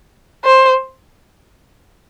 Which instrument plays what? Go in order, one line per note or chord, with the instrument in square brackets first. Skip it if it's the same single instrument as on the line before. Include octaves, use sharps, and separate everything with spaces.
[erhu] C5